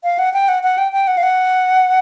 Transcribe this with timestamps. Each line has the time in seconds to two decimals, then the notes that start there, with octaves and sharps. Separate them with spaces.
0.04 F5
0.19 F#5
0.34 G5
0.48 F#5
0.63 F#5
0.78 G5
0.92 G5
1.07 F#5
1.17 F5
1.23 F#5